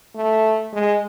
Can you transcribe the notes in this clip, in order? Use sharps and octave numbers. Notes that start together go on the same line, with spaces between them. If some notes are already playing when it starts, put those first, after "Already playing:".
A3
G#3